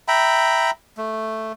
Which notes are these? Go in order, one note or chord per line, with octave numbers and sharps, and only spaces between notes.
E5 G5 A#5 B5
A3